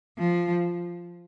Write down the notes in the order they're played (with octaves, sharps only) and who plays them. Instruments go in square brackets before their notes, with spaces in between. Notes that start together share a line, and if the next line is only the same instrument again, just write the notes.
[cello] F3